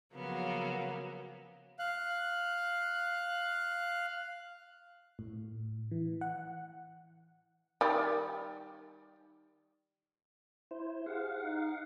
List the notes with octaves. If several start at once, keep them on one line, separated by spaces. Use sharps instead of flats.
C#3 F3 F#3 A#3 B3
F5 F#6
A2
E3
F#5
D#3 G3
E4 C5
G4 G#4 F5 F#5
D#4